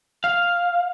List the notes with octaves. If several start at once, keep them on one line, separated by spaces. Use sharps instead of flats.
F5